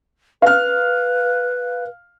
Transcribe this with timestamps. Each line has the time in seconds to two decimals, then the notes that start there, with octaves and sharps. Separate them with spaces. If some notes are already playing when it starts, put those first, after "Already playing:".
0.42 B4 F5 F6